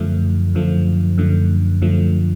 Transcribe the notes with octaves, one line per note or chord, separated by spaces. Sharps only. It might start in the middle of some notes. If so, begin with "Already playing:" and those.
Already playing: F#2 D3 F3 A3
F#2 D3 F3 A3
F#2 D3 F3 A3
F#2 D3 F3 A3